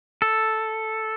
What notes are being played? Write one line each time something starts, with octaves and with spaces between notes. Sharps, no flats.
A4